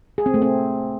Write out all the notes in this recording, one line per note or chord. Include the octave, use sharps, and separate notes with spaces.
G#4
C4
A3
C4